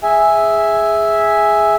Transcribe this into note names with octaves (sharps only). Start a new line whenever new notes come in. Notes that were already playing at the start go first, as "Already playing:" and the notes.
G#4 E5 G#5